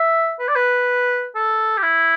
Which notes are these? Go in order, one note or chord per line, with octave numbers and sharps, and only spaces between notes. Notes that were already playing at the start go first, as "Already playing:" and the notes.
Already playing: E5
B4
D5
B4
A4
G4
E4